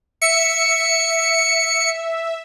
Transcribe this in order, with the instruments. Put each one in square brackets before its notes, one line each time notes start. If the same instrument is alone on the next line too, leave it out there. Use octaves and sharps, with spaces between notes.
[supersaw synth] E5 [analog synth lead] C#7